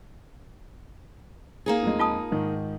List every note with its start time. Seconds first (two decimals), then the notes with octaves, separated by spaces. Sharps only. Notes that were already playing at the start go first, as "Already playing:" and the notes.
1.66 A#3 D#4 G#4
1.83 F2 G#3
1.99 F4 A5 D#6
2.31 G#2 D#3